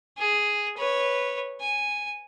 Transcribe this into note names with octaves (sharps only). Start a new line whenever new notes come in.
G#4
B4 C#5
G#5